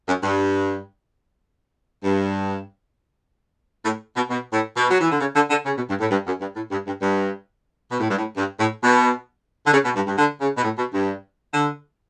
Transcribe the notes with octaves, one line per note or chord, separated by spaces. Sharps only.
F#2
G2
G2
A2
B2
B2
A2
B2
F#3
E3
D3
C#3
D3
D3
C#3
B2
G2
A2
G2
F#2
G2
A2
G2
G2
G2
B2
A2
G2
A2
G2
A2
B2
D3
C#3
B2
G2
G2
D3
C#3
B2
A2
B2
G2
D3